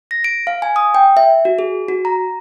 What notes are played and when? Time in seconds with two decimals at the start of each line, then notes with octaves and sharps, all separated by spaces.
0.11 A#6
0.24 D7
0.47 F5
0.62 G#5
0.76 D#6
0.94 G5
1.17 E5
1.45 F#4
1.59 G#4
1.88 F#4
2.05 A#5